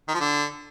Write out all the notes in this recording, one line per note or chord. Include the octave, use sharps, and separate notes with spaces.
D#3
F3
D3